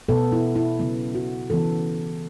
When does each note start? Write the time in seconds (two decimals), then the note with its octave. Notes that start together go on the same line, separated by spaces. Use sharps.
0.09 B2 B3 A4
0.32 E4
0.56 E4
0.79 C#3 F#3 B3
1.15 F#4
1.50 C#3 E3 B3 A4